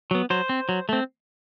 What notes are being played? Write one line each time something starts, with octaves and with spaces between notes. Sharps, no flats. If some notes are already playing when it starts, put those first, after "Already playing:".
F#3 B3
F#3 C5
C4
F#3
A3 C4